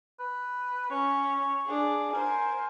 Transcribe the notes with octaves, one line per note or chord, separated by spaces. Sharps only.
B4
C#4 C#5
D4 G#4
A#4 C5 G#5